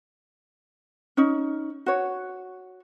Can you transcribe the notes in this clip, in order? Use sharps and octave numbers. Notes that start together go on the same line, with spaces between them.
C#4 D#4
F#4 C#5